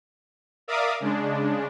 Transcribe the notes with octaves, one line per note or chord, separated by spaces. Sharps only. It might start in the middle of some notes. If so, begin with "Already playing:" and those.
A#4 D5 E5 F5 D6 D#6
C#3 G#3 D4